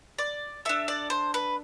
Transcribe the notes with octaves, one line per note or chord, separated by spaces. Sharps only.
D5
D4 A4 E5
D5
C5
B4